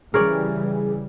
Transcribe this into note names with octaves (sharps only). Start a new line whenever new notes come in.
C#3 E3 G3 G#4 A#4 C#5 D5